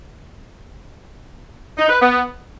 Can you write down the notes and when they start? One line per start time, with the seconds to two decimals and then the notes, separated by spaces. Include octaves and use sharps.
1.77 D#4
1.89 B4
2.01 B3